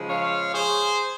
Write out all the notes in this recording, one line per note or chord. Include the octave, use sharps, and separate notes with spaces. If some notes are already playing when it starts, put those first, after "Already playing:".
Already playing: C#3 F3 G#3
C#5 F5
G#4 C5